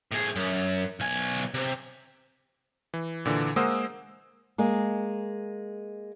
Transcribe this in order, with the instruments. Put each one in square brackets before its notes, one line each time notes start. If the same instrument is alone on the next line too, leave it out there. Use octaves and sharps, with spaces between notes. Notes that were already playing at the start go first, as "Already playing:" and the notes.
[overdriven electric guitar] A2 G#4
F#2
B1 G#5
C3
[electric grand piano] E3
A#2 D3 E3
G#3 A#3 C5 F#5 D#6 E6
[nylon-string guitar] G#3 A#3